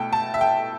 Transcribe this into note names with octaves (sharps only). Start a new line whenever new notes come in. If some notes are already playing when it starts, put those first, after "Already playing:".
Already playing: B2 A3 E4 G5 A5
A5
E5
G5